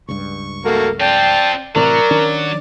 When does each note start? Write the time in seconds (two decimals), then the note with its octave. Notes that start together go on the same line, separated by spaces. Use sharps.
0.08 C#2 G2 C#6
0.65 A3 A#3 F#4
1.00 C4 F4 D5 G5 A5
1.76 A2 C3 E3 F#3 A#4 D5
2.11 D#3 C#4 D4